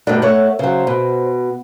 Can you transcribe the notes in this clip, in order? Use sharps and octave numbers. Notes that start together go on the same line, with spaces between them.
G2 B2 D#3 A3 D4
A3 C#5 F#5
C#3 F#3 C5
B2